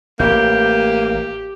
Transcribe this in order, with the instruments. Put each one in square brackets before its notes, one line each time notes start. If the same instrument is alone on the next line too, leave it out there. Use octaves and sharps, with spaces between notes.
[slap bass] A1 [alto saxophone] A#3 [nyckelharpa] G4 [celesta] G6